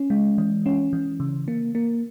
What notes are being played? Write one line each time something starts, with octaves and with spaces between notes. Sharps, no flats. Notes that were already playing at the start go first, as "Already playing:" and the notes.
Already playing: C#4
G#3
E3
C#4
E3
C#3
A#3
A#3